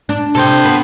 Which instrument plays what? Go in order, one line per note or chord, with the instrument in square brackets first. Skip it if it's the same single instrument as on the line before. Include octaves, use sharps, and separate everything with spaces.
[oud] D4
[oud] C3 C4 [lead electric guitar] A4 G5
[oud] B3